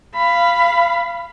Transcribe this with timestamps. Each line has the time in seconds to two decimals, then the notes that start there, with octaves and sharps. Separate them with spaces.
0.15 F5 B5